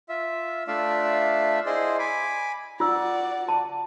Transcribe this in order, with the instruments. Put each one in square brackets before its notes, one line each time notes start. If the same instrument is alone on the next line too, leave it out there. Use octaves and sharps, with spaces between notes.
[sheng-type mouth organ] F4 E5
A3 D4 F4 D5 E5 F5
E4 G#4 C5 D5 D#5 C6
G#5 B5 D6
[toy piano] F4 E6 [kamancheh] F#4 D5
[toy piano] A5